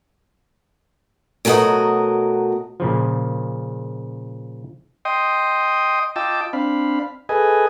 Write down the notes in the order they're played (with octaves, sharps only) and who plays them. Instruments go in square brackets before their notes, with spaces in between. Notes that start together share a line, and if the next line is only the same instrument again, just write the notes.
[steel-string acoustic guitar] B2 F#3 A3 F#4 A#4 D#5
[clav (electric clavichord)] A#2 C#3 F3
[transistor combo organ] D#5 G5 C6 D#6
F4 D#5 G5 A5 D6 E6
C4 D4 F5 B5
G#4 A4 B4 D#5 G#5